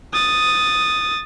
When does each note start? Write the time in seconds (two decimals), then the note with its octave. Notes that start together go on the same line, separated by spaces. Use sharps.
0.13 D#6 A6